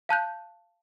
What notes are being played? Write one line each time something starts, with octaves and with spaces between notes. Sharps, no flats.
F5 A5 F#6 G6